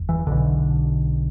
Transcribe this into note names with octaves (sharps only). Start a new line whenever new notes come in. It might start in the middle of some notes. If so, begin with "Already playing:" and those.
Already playing: F#1 E2
E3
B1 B2 D3